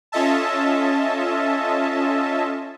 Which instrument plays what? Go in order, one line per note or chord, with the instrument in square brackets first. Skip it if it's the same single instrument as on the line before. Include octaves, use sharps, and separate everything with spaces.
[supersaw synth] C#4 F4 A4 D#5 E5 A5